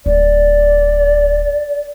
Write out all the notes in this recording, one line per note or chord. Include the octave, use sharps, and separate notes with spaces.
D1 D5